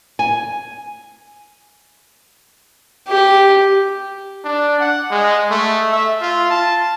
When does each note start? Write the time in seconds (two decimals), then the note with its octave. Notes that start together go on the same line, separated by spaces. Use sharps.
0.19 G#5
3.09 G4
4.44 D4
4.80 F#5
5.11 G#3
5.50 A3
5.93 E5
6.21 F4
6.51 A5